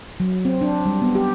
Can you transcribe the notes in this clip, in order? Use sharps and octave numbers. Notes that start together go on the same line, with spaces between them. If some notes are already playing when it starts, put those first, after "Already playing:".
F#3
C4
D4
G3
B3
G4